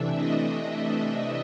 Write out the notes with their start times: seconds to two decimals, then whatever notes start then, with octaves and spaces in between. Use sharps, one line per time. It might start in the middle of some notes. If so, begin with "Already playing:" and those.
Already playing: C3 E3 A3 D4 E5
0.16 D#5